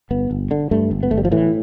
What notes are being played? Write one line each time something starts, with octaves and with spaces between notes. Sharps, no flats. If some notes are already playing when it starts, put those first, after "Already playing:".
G1 B3
G1
D3
G2 A3
G1
B3
G1 A3
G3
F3
A2 E3